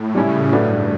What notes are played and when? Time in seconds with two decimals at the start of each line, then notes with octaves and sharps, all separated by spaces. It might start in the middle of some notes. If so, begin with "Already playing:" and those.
Already playing: A2
0.15 C#3 G3 C#4 E4
0.51 G2 F#3 A3 D4 F#4 B4